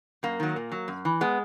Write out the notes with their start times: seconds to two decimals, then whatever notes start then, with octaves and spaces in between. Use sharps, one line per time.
0.23 F#2 A#3
0.40 D#3 F#3
0.56 A#2
0.72 F#3
0.88 F#2
1.05 E3
1.21 G#3 B3